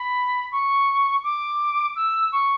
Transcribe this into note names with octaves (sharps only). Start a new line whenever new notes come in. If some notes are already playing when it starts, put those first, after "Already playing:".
Already playing: B5
C#6
D6
E6
C#6